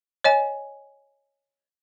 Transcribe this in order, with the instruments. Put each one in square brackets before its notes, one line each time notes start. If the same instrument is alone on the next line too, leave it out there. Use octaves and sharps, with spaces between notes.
[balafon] C#5 D#5 G#5